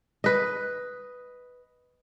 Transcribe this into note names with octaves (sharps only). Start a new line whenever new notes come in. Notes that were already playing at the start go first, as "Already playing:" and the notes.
B4 D#5